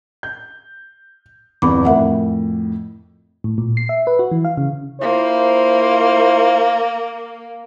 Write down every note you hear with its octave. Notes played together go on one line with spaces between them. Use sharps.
G6
G1 E2 C4 B5 D6
F2 A2 A#4 E5 F#5
A2
A#2
C7
E5
B4
F#4
E3
F5
C#3
A#3 E4 F4 C5